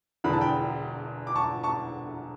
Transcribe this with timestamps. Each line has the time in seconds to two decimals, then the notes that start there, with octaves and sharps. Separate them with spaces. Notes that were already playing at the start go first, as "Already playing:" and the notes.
0.24 E1 E2 D3 B5
0.33 A5
0.41 G5 B5
1.27 D6
1.36 A5 C#6
1.63 A5 C#6